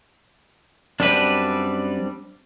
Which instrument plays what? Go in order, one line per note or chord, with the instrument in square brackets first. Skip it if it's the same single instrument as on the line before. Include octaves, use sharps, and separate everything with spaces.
[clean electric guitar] F#2 B4 [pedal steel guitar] G3 C4 D4